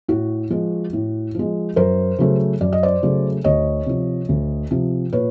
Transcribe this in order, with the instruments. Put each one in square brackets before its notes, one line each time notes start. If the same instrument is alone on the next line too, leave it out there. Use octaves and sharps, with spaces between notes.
[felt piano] A2 F#4
F3 G#3
A2
F3 G#3
F#2 A#4 C5
C#3 F#3 A3
F#2 D5
D#5
C5 D5
C#3 F#3 A3
D2 C#5 D#5
C3 F3
D2
C3 F3
A#2 B4 C#5